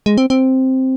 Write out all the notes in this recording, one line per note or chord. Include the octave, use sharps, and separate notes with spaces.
G#3
C4
C4